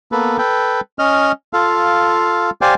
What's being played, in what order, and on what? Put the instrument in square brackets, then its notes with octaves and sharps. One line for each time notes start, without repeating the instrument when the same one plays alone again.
[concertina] A#3 B3 A4 B4
A4 B4 G5
C#4 D#5 F6
F4 A4 F5
G4 C5 D5 F5 G5 G#5